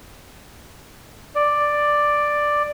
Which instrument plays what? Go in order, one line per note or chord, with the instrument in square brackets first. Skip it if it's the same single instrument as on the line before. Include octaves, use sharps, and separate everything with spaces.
[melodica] D5